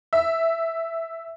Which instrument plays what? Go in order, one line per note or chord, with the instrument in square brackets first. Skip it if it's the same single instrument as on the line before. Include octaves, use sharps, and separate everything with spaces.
[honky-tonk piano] E5